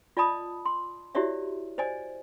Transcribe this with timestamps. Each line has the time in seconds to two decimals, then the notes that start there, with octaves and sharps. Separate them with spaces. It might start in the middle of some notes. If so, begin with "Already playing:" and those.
0.17 F4 D5 D#5 A5 B5 D#6
0.65 C6
1.15 E4 F#4 G4 C#5 D5 E5
1.78 C5 D5 D#5 G#5